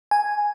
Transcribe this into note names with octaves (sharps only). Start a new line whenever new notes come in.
G#5